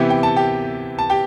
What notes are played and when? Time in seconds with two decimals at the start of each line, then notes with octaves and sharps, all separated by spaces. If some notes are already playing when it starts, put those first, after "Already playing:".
Already playing: C3 E3 B3 E4 G4 G5
0.10 G5
0.23 A5
0.36 G4 G5
0.99 A5
1.10 G4 G5